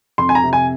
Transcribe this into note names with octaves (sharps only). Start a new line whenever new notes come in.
F2 C6
G#5
A#5
C3
G#5